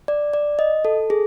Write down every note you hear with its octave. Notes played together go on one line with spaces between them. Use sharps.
D5
D5
D#5
A4
G#4